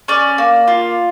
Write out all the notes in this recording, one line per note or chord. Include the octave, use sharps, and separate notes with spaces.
C#4 D5
A#3
F4